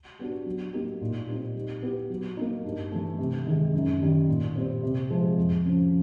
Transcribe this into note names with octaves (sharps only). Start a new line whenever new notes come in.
G3 B3 D4 F#4
F#3
A#3 D#4 G4
A#2
G3 C4 D#4
G3
B3 E4 G4
F#3
A#3 D#4
G2
E3 A3
C3
D#3 G#3
F#2
D#3 G3
A#2
G3 C4
C3
F3 G#3
F2
C#3 F3